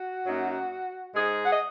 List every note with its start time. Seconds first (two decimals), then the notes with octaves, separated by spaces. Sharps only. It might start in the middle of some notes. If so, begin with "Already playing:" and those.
Already playing: F#4
0.26 F#2 F#3 A#3 D#4
1.14 G#2 G#3 D#4 G#4
1.44 F#5
1.51 D#5